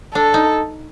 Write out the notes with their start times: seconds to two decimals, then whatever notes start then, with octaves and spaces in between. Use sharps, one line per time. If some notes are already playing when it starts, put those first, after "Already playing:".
0.14 D4 A4
0.34 D#4